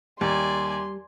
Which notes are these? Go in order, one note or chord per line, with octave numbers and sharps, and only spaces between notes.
D#2 G3 D5 G#5 C6